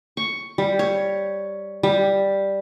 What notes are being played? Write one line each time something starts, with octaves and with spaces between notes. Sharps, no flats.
C#6
G3
C#5
G3